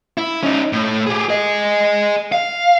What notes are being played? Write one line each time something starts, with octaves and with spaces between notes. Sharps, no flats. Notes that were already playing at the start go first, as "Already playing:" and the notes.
E4
C#4 D#4
A2
G4 G#4
G#4 D#5
F5